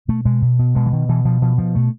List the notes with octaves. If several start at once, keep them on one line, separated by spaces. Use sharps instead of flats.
B2 A3
B2 G#3
B2
B2
B2 G#3
E3
B2 D#3
B2 E3
B2 F3
B2 F3
B2 F3
B2 A3